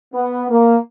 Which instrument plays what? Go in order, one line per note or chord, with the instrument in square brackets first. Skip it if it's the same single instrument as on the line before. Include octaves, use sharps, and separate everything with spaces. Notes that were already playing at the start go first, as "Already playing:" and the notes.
[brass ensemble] B3
A#3